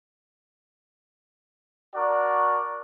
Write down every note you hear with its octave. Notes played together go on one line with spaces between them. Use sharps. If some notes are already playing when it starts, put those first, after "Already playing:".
D4 F#4 A#4 D5